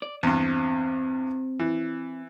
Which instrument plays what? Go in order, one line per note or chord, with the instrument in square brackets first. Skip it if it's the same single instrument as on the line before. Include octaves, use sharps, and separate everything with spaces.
[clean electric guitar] D5
[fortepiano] E2 G2 [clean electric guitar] C4
[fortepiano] E3